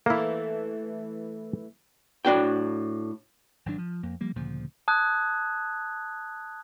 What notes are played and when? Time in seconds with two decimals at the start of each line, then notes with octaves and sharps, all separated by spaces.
0.06 E3 A3 A#3 E4
2.25 A2 D4 F#4 G5
3.66 G#1 F#3 D4
3.78 F3
4.03 F2 A#3
4.21 F3 G3 A#3
4.36 D2 A#2 C#3 F3
4.88 A5 D#6 F#6 G#6